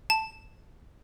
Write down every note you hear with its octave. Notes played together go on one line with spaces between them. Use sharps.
A5